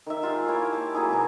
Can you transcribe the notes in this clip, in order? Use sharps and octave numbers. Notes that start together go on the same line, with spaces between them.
D#3 E5
F4 G4 G#4
A#3 E4 C#5 G5
A5
F#3 A#3 E4 G#4
C3 E3